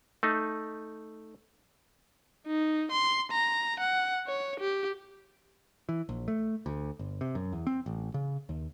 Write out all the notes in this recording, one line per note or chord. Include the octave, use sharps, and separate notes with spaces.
A3 D#4
D#4
C6
A#5
F#5
C#5
G4
E3
A#1
A3
D2
G1
C3
F#2
E2
C4
A1
C#3
D#2